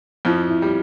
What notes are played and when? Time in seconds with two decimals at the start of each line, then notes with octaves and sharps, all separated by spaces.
0.25 F2 F3 E4
0.51 E4
0.62 G3